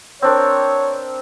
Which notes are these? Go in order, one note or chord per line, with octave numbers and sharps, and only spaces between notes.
C4 D4 A#4 C#5